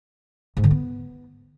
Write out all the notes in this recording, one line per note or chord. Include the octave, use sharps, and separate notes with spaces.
G#2
D3
B3